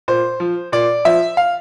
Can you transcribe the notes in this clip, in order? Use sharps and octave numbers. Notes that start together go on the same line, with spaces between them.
A#2 C5
F3
A#2 D5
F3 E5
F5